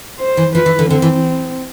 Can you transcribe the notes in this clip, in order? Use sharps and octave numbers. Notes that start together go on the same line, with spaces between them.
C5
E3
F3 B4
E3
D3
D3 C4
E3